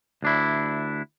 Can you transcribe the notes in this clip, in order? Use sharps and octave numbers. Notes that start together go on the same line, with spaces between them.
D2 D4 E4